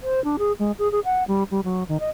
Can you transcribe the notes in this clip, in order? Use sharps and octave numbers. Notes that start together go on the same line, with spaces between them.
C5
D4
G#4
G#3
G#4
G#4
F#5
G3
G3
F#3
D#3
D#5